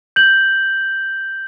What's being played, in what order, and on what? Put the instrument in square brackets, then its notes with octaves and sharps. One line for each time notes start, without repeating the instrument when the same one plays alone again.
[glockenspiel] G6 F#7